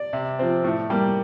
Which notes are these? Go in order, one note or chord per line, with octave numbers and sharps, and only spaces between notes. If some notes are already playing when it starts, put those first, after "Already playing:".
Already playing: D5
C3
F3 C4
A2
G3 A#3